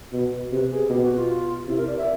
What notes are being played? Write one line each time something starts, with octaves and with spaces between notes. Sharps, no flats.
B2
C3 B4
G#4
B2 G4
F#4
F4
C3 E4
A#4
D5
E5